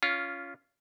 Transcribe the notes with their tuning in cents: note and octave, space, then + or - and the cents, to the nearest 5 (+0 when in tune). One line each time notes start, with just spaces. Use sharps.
C#4 +20 F4 -5